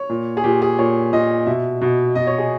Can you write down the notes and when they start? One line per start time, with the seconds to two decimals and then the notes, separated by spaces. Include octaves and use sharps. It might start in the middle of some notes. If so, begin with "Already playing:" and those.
Already playing: C#5
0.09 A#2
0.37 G#4
0.44 A#2 G4
0.62 G#4
0.79 A#2 C#5
1.13 A#2 D#5
1.47 B2 E5
1.81 B2
2.15 B2 D#5
2.27 C#5
2.38 G#4